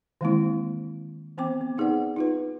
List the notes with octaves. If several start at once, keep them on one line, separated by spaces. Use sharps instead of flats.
D#3 E3 G#3 A#3 C4 E4
E3 B3 C4 C5 G5 D6
B3
B3 D#4 G#4 B4 D5 F#5
D#4 F4 B4